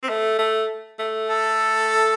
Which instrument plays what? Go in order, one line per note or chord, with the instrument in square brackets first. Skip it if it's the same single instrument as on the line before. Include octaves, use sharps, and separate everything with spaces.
[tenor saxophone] C4
A3
A3
A3
[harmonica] A4